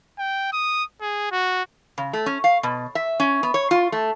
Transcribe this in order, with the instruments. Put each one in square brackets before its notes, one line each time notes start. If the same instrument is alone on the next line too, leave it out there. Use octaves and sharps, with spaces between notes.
[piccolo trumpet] G5
D#6
G#4
F#4
[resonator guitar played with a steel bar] C#3
A3
C#4
F5
B2
E5
C#4
B3
C#5
F4
A3